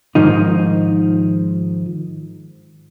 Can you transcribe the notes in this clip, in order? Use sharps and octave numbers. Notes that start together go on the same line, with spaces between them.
G#2 D#3 F3 D#4